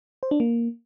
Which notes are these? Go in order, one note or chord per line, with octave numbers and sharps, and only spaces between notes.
C5
D4
A#3